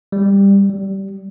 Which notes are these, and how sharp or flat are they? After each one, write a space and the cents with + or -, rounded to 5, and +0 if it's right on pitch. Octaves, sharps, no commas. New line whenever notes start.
G3 +15
G3 -20